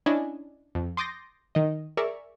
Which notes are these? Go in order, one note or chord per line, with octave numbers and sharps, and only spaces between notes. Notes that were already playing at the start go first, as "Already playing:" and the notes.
C#4 D4 E4 D#5 G#5
F2
C6 D6 D#6 G6 A6 A#6
D#3 D#5
G#4 A#4 D5 E5 C#6